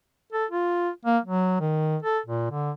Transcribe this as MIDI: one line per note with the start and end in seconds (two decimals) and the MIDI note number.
0.33 0.46 69
0.51 0.89 65
1.05 1.18 58
1.25 1.55 54
1.60 1.97 51
2.03 2.19 69
2.26 2.47 46
2.51 2.71 50